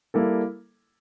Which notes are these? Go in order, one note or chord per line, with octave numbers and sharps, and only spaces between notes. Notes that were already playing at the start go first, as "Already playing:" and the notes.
G3 A#3 E4 A4